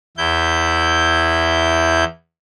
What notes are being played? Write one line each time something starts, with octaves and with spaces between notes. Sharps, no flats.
E2 E4 G6